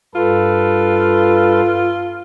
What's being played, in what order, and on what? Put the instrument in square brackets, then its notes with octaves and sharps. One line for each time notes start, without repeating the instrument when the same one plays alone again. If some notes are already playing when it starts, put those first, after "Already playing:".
[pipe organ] G2 A4 B4 [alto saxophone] F4